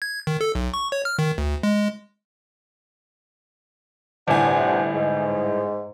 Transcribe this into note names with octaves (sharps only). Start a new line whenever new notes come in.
G#6
D#3
A4
B1
C#6
C#5
F6
D#3
D2
G#3
G1 A2 C3 D4 F#5 G#5
G#2